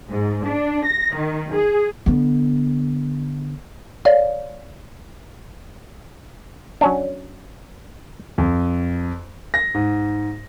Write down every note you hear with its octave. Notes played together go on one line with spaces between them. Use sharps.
G#2
D4
A#6
D#3
G#4
D3 B3
C#5 D5 F5
F#3 C#4 D4
F2
A#6
G#2